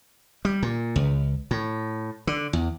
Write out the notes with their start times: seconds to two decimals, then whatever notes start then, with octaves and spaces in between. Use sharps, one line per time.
0.45 G3
0.63 A#2
0.96 C#2
1.51 A2
2.27 D3
2.53 E2